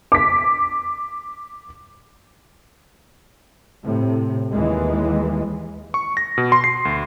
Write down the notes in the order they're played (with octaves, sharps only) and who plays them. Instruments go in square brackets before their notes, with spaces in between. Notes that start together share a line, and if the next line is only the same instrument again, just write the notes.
[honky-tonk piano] D6 B6
[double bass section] A2 C3
D#2 E3 G#3
[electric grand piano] C#6
A#6
B2
C6
C7
D2